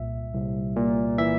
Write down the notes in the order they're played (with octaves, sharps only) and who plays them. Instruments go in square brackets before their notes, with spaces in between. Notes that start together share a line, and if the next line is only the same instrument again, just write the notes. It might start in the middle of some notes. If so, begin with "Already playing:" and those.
Already playing: [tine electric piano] C2 A#2 E5
C2
A#2
E3 E5